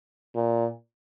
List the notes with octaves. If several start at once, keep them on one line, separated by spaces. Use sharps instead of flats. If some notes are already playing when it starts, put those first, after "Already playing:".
A#2